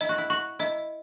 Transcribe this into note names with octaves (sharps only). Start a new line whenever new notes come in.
E4 D#5
F#4
E4
F#4 C#6
E4 D#5